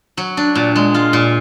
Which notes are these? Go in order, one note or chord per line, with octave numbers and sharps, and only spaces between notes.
F#3
D4
A#2
G#3
F4
A#2